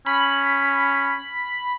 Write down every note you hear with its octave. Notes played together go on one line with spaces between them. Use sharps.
C#4 B5